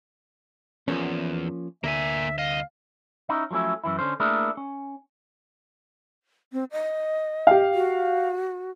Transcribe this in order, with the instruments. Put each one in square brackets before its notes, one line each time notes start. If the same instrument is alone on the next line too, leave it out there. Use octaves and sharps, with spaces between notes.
[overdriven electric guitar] E2 [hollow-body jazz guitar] F3 A#3 C#4
[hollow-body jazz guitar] D2 [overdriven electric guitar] A#3 G#5 [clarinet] E5
[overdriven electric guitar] C2 D#5 [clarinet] F5
[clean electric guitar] C#4 D#4 E4
F3 F#3 A3 C#4 E4
F#2 E3 E4
D3 C#4 C5
A3 A#3 D4 E4 G#4 A#4
C#4
[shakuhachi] C4
D#5
[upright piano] G4 F5
[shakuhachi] F#4